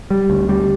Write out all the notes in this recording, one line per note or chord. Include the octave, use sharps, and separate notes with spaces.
G3
D2
G3